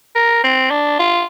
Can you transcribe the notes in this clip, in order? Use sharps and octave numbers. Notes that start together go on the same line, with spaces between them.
A#4
C4
D4
F4